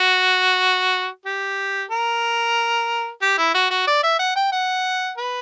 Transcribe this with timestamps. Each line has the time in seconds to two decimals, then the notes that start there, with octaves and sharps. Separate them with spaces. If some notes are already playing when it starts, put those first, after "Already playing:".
Already playing: F#4
1.26 G4
1.91 A#4
3.22 G4
3.38 E4
3.55 F#4
3.71 F#4
3.87 D5
4.03 E5
4.19 F#5
4.36 G5
4.52 F#5
5.18 B4